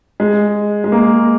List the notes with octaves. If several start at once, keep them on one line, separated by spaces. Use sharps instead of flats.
G#3
G#3
A#3